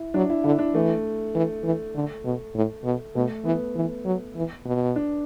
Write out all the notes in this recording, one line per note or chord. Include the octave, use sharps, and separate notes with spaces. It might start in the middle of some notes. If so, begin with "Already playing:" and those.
Already playing: E4
F#3 D4
E4
D3 E4
D4
E3 A3
E3
E3
D3
B2
A2
B2
B2 A3
E3 B3
E3
F#3
E3
B2
D4